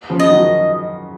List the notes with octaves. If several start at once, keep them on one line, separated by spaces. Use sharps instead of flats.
C#3 F3
D#5
D#3 F#3